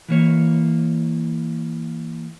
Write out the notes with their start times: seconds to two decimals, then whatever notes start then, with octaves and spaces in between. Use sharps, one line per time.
0.09 E3 A#3 C#5